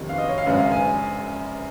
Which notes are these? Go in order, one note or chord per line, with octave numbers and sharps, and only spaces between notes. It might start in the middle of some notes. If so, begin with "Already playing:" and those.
Already playing: F#1 F2 C3 D#3
F5
D#5
C#5
F5
G#1 F#2 C#3 G#3 F#5
F5
G#5